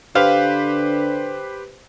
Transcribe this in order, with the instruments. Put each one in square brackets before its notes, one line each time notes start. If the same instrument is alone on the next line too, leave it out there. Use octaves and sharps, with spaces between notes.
[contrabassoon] D3 [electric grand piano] G4 B4 C5 [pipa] F5